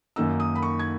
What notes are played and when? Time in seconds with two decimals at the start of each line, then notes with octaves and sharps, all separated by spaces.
0.16 F#2 D#3 A#3 D#4 E6
0.40 D#6
0.55 B5
0.62 C#6
0.79 G#6